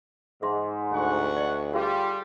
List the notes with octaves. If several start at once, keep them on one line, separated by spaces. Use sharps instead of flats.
G#2 G#4 E5 C6
D2 F#5 C#6
D5 D#5
G3 F4 G4 G#4 G#5